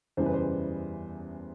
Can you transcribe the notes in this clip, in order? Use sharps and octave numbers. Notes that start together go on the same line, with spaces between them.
F#1 E2 C#3 E3 G3 C5
B4
C5